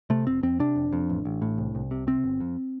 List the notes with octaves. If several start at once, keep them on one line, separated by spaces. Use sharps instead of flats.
C3 A3
F1 C4
F2 C4
C3 D4
F1
F2
A1
A1
A2
C2
C2
C3
C3 C4
G1
F2